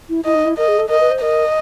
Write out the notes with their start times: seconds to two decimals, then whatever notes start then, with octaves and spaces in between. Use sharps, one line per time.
0.09 E4
0.25 E4 D#5
0.35 D#4
0.45 E4
0.58 A#4 D#5
0.68 G#4
0.78 A4
0.89 A#4 D#5
1.00 B4
1.11 C5
1.21 A#4 D#5